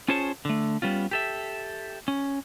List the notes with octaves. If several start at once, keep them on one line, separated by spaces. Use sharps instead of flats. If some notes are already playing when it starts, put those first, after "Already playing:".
C#4 F4 G#4 C5 C#5 A5
D3 A3
G3 B3 C#4 F4
G4 A4 E5
C#4